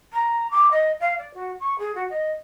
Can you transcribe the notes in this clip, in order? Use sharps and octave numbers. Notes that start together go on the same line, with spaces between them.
A#5
D6
D#5
F5
D5
F#4
C#6
G#4
F#4
D#5